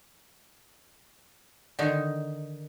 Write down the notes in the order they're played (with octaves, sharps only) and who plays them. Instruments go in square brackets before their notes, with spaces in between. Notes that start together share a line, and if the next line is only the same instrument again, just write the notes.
[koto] D3 D#3 D#4